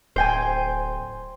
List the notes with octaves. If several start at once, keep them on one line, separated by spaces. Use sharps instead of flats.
D1 C5 G5 G#5